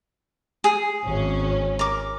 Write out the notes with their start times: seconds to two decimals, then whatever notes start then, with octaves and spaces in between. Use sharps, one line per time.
0.64 G#4
1.05 G#1 C#4
1.79 A#4 D6